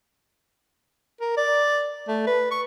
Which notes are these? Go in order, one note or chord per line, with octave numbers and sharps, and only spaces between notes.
A#4
D5
A3
B4
C#6